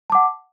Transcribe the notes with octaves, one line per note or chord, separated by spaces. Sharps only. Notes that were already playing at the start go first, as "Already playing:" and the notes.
F#5 A5 D6